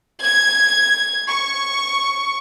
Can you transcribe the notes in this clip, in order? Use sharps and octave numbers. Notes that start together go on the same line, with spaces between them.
G#6
C#6